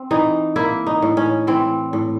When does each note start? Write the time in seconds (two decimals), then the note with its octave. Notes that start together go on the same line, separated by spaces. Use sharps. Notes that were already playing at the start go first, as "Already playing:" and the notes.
Already playing: C4
0.11 E3 D#4
0.56 A#3 E4
0.87 D#4
1.02 A2
1.17 C#4
1.47 E3 C4
1.93 A2